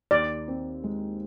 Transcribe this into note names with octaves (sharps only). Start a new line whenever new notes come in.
D#2 D5
C4
G#3